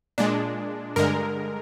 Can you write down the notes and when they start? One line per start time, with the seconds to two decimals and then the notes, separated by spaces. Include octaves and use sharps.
0.18 A#2 G#3 D4
0.96 G2 D3 G#3 A#4